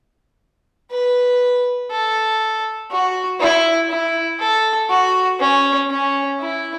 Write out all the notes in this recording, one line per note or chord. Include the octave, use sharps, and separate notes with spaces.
B4
A4
F#4
E4
E4
A4
F#4
C#4
C#4
E4